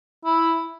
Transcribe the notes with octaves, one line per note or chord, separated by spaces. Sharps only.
E4